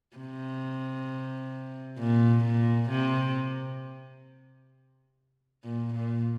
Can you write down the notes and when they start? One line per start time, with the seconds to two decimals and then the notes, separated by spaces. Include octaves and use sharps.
0.17 C3
1.99 A#2
2.45 A#2
2.90 C3
5.64 A#2
5.94 A#2